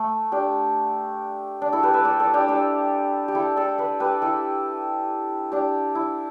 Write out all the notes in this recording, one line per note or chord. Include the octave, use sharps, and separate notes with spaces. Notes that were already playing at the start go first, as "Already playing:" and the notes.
Already playing: A3
D4 G4
D4
E4 A4
G4 B4
B4 E5
A4 D5
A4 D5
D4 G4
D4 G4
G4
E4 A4
A4 D5
B4 E5
G4 B4
E4 A4
D4 G4
E4